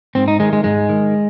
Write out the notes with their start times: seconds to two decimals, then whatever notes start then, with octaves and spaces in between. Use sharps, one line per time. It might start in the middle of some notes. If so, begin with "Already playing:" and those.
0.15 G#2 C4
0.28 D#4
0.40 D#3 G#3
0.53 G#3
0.64 G#2 G#3
0.89 D#3